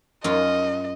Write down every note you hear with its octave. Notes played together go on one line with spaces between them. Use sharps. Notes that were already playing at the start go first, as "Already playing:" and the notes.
F#2 F4 D#5